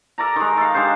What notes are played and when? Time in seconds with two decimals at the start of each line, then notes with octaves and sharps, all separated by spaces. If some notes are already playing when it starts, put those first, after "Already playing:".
0.18 A4 A#4 D5 A#5
0.36 D#3 G#3
0.57 A4 F5
0.74 G#3 D4 G4 C5